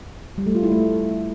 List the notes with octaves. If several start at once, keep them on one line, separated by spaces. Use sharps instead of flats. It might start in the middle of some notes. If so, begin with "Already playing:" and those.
G3
A3
F4
E4
A3